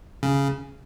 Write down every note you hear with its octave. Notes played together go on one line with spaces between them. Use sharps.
C#3